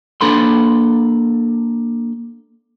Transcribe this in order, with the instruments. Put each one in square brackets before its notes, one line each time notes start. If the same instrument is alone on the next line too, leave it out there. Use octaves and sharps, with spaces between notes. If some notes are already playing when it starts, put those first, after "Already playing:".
[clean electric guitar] A#3 D4 A4 B5 C6